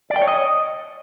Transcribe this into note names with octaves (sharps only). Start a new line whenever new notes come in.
D5
G5
C#5
D#5